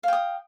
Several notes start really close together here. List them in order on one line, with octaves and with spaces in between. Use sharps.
F5 G5 D#6